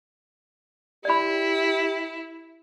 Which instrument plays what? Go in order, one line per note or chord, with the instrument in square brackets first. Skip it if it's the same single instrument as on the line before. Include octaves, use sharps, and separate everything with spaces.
[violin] E4 [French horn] G4 [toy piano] D5 B5